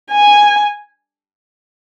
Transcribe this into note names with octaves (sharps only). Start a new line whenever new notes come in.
G#5